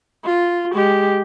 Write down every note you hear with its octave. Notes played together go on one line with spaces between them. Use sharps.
F4
G#3 G4